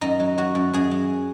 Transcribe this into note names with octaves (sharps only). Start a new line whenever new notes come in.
F#2 D#4
F#3
F#3 F#4
F#2
F#2 G#4
F#3